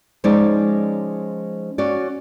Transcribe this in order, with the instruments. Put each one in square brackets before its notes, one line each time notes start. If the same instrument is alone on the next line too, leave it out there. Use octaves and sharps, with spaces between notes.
[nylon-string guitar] F3 G#3 C#4 D#4 D5
C#4 F#4 D5